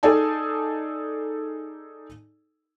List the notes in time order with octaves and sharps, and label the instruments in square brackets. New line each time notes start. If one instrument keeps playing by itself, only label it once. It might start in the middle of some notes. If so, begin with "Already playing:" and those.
[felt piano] D#4 G#4 A4 D5 G#5 A5